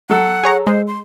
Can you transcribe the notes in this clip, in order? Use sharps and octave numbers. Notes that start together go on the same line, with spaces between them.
F#3 A4 F#5 E6
G#4 C#5 A#5
G#3 C5
C6